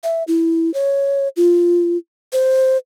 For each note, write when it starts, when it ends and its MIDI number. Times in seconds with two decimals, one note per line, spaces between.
0.04 0.23 76
0.28 0.73 64
0.74 1.28 73
1.37 1.97 65
2.33 2.77 72